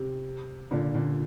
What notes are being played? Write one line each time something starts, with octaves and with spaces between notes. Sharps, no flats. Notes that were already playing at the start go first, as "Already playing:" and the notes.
Already playing: C3
A#2 D3
A#2 D3